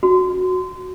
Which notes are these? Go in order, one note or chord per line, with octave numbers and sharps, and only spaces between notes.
F#4